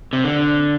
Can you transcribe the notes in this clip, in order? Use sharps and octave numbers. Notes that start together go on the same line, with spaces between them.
C3
D3